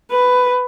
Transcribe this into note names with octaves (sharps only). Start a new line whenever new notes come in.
B4